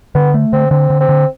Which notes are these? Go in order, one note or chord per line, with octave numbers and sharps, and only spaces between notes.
D3 B3
A3
D3 C4
D3 C4
D3
C4
D3